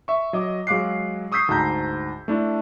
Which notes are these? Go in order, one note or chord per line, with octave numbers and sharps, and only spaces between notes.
E5 C#6
F#3 D#5 D6
F#3 G#3 F5 D6 F#6 C7
C#6 D#6 E6 G6 B6 C7
D2 G#2 A5 A#5 G6
A3 D4 E4